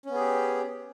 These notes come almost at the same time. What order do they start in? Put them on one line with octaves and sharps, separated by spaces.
C#4 B3 G#4 G4